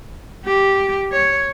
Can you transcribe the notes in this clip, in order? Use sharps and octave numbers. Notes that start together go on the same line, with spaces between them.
G4
C#5